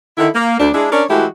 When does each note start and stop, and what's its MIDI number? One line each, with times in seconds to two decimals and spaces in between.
0.18 0.29 50
0.18 0.29 51
0.18 0.29 64
0.35 0.55 58
0.60 0.70 38
0.60 0.70 62
0.75 0.89 56
0.75 0.89 62
0.75 0.89 64
0.92 1.04 61
0.92 1.04 62
0.92 1.04 70
0.92 1.04 73
0.92 1.04 74
1.10 1.26 52
1.10 1.26 56
1.10 1.26 57
1.10 1.26 64
1.10 1.26 66
1.10 1.26 67